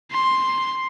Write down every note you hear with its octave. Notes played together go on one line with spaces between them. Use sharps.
C6